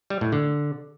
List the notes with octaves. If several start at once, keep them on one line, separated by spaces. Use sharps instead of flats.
G3
A2
D3